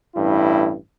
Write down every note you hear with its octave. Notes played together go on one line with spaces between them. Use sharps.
A1 G2 E4